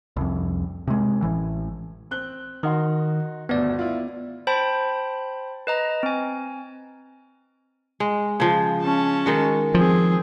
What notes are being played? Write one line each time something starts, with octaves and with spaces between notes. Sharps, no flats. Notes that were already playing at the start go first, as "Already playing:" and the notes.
C2 F2
C3 G#3
A1 E3
C4 F#6 G7
D#3 D#4 F#4 C6
G1 D2 B3 D5
E4 F4
C5 G5 A5 B5
B4 D#5 A#5
C4 G#5
G#3
C#3 F3
C#4 A5
D#3 G#3 F#4
F3 C4 G#4